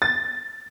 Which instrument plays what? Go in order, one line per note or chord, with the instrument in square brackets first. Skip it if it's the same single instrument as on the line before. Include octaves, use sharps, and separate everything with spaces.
[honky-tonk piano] A6